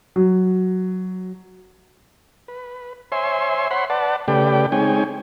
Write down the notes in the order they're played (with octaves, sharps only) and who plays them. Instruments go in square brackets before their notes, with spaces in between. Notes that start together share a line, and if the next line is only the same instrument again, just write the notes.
[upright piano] F#3
[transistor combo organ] B4
C5 C#5 E5 G#5 C6
C5 C#5 F#5 B5 C6
B4 D5 F#5 A5
C#3 A3 G4 B4 D5 G5
G#3 C4 D#4 C#5 G5 G#5